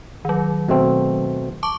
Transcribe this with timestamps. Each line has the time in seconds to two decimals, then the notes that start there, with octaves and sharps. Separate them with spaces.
0.25 D#3 F#3
0.69 B2 A3 C4
1.63 A5 C#6 D6